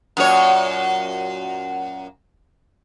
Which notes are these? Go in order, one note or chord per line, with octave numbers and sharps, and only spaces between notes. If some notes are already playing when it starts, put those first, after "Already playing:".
F#2 A#2 C#5